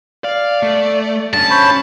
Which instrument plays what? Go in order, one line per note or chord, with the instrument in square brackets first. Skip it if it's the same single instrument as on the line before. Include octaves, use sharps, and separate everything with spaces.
[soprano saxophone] D5 [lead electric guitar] F5
[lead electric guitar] A3
[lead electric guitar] G2 C#4 [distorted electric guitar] A5
[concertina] C5 C#5 B5